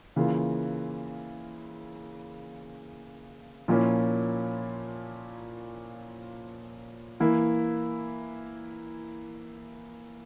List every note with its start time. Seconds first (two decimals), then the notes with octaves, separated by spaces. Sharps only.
0.16 C#3 E3 A#3 F4
3.68 A#2 F3 A#3 C#4 E4
7.20 E3 A#3 E4